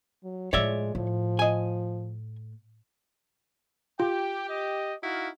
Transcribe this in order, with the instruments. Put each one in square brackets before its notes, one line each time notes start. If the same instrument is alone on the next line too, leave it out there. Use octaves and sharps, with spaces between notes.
[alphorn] F#3
[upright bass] A2 F3 [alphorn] G#3 [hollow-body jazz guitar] C#5 D5 E5
[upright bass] A2 [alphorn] F3
[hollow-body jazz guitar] D#5 G#5
[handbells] F4 [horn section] G4 [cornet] G5
[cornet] D#5
[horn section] D#4 E4 F5 [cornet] F#4